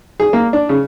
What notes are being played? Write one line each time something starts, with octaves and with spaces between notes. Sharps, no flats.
G#4
A#3
D4
C#3